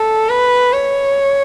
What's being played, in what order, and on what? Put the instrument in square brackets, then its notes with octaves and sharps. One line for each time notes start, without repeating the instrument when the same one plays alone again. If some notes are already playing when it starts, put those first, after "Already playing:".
Already playing: [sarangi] A4
B4
C#5